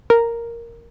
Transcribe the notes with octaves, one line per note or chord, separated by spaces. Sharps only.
A#4